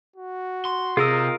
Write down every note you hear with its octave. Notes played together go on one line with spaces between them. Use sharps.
F#4
C6
C3 F4 G#4 A#4 D#5 E6